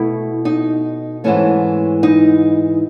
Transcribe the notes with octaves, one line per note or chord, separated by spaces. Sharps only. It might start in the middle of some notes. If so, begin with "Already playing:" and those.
Already playing: B2 A3 E4
D#4
G#2 E3 A3 C#4
D#4